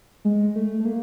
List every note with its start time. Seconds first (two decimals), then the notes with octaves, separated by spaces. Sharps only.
0.25 G#3
0.56 A3
0.80 A3
0.85 A#3